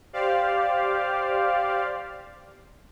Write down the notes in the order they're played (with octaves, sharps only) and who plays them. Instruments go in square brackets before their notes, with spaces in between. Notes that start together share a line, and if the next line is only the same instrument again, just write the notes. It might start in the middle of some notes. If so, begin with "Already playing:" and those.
[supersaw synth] G4 C5 D5 F5